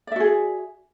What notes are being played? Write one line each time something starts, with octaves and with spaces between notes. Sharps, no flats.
F#4 G#4 D5 E5